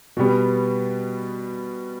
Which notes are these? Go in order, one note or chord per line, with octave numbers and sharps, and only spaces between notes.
B2 G3 B3